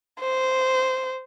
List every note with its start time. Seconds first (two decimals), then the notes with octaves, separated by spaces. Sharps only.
0.21 C5